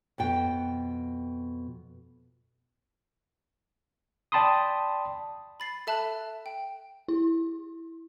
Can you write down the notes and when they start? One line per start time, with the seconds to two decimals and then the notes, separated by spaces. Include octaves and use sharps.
0.18 F2 B2 G5
4.32 D5 G5 A5 B5 C6 D#6
5.60 B5 A6 C7
5.87 A4 E5 A5 B5 F#6
6.46 G5
7.08 E4